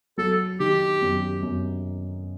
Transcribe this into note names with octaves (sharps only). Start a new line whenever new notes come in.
F#3 A4
D#3 G4
F#2
F#2